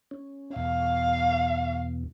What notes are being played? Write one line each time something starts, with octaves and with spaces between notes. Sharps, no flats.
C#4
E2 B2 F5